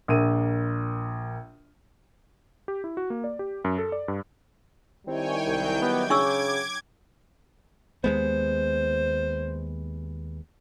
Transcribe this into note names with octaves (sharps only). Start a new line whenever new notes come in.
A#1 A#4 D#7
G4
E4
F#4
A#3
D5
G4
F#2
A4
D5
G2
D#3 G3 C4 E4 C#5 G5 G#5
C2 F#3 G5 G6
B3 D6 G#6
C#3 D4 C#6 E6
D#2 G#3 B3 C5